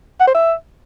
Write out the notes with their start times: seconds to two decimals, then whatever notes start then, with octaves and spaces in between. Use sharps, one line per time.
0.20 F#5
0.27 C5
0.35 E5